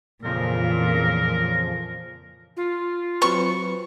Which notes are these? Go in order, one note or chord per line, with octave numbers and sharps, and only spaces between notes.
F2 A#2 C#3 E3 F3 A#4
F4
F#3 C4 B4 C#6